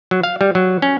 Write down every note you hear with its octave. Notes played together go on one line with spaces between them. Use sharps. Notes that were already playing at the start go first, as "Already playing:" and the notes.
F#3
F5
G3
F#3
C#4